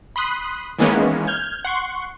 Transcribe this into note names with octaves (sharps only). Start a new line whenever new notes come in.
B5 C6 D#6 F#6
D#3 E3 G#3 A#3 B3 C#4
F6 G6 G#6
F#5 C6 C#6